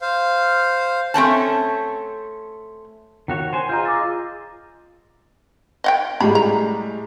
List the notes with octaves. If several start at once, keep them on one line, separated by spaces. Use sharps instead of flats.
C5 F5
A3 C4 C#4 A5
D#3 F#4 C#5
C5 G#5
F4 G#4 D#5 A#5 C6 G6
D6 E6 A6
D#5 F#5 G5
A2 G3 G#3 A#5 B5
A#5